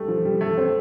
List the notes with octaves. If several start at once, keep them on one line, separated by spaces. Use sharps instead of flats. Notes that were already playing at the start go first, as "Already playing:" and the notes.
Already playing: G3 A3
F3
G3
A3
C4